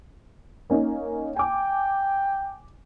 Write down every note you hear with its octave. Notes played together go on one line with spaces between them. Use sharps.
A#3 C#4 D#4
G5 G#5 D6